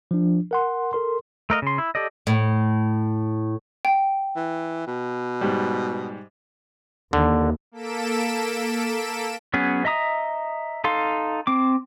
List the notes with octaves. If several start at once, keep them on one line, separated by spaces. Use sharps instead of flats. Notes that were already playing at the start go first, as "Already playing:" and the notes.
F3 D4
A#4 F#5 C6
A4 A#4 C6
A3 A#4 D#5 F5
C#3 C6
E4
G4 A4 D5 D#5
A2
G5
E3
B2
G#2 G3
D#2 D3
A#3 A4 B6 D7 E7
F#3 B3 C#4 G#4
D#5 E5 A#5 D#6
D#4 A4 F5 C6
C4 D6